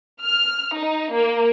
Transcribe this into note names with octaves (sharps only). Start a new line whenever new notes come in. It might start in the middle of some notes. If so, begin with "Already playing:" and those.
F6
D#4
A#3